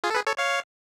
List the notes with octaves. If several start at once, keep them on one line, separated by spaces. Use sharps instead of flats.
F4 G#4
A4
G#4 B4
A4 C#5
C#5 F5